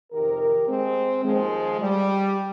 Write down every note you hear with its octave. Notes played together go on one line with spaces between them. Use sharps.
F2 C3 D#3 G4 A#4
G#3 C4
D#2 D#3 F3 G#3
G3